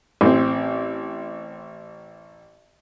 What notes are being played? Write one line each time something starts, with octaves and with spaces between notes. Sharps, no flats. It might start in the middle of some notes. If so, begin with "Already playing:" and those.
A1 C4